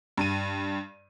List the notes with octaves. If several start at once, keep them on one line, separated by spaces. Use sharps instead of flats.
G2 D#7